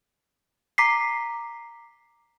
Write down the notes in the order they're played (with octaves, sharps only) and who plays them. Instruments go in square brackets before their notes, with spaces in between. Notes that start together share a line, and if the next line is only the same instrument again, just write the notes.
[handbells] A#5 D6 B6 C7